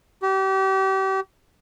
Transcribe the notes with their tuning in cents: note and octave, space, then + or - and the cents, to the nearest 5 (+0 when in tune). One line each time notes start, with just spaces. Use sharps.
G4 -35